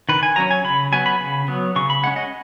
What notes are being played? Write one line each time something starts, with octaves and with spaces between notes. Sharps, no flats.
D#3 B4
G#5
F#3 C#4 A#5
G#5
C#3 B5
F#3 B3 G#5
B5
C#3
F#3 B3
C#3 C#6
B5
G#3 C#4 F#5
D#5